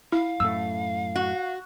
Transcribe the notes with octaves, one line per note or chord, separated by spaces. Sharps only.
E4 F5
F#2 A2 A3 E6
F#4